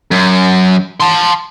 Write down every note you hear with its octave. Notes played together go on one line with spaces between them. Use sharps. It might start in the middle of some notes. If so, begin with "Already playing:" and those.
F#2
A5 C6